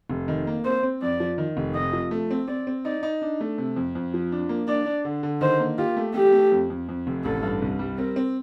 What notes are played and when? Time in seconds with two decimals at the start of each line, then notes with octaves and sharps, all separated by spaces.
0.10 F1
0.28 D#3
0.47 A#3
0.65 C4 C5
0.83 C4
1.02 F2 D5
1.20 F3
1.38 D#3
1.57 F1
1.75 C3 D#5
1.93 F3
2.11 A3
2.31 C4
2.48 C4 D5
2.67 C4
2.85 D#4 D5
3.03 D#4
3.22 D4
3.41 A3
3.58 C3
3.76 F2
3.95 F2
4.14 F3
4.32 D4
4.49 A#3
4.68 D4 D5
4.86 D4
5.05 D3
5.23 D3
5.41 D#3 C5
5.60 A#3
5.78 F4 G4
5.97 A3
6.14 A3 G4
6.32 A3
6.51 F2
6.70 F2
6.89 F2
7.07 F1
7.24 A1 A4
7.43 G2
7.62 C2
7.79 G3
7.98 C4 A#4
8.16 C4